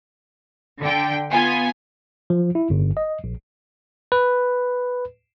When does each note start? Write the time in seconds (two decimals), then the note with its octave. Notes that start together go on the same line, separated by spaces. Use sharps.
0.81 D3 G5
1.31 B3 F4 G#5
2.30 F3
2.55 E4
2.70 G1
2.97 D#5
3.24 A#1
4.12 B4